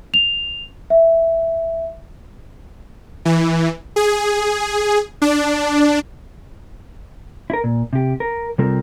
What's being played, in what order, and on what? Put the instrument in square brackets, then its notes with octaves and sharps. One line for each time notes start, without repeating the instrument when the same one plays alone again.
[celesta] F7
E5
[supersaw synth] E3
G#4
D4
[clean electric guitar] E4 A#4
A#2
C3 G4
A#4
C3 G3 C4 F4 A4 A#4